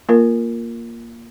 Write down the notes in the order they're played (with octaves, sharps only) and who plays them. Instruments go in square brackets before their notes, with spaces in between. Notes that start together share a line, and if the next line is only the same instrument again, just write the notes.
[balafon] A#3 F4 A#4